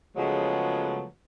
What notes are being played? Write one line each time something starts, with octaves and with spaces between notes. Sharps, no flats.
C#3 F3 F#3 G#3 A3 B3